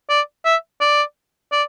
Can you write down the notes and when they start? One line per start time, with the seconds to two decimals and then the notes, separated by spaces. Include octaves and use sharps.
0.10 D5
0.45 E5
0.81 D5
1.52 D5